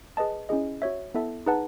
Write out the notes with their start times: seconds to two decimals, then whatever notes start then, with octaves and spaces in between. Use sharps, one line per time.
0.17 G#4 B4 D#5 A5
0.49 C#4 E4 G#4 D#5
0.82 F#4 C#5 E5
1.14 B3 E4 A4 E5 A5
1.46 D#4 G#4 B4 F#5 A5